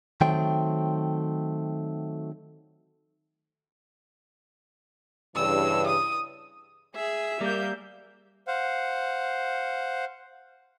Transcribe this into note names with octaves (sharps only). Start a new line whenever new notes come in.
D#3 F#3 A3 C4 G5
G2 C#3 E3 E6
D#6
G#4 E5
G3 A#3 G6
C5 F5 F#5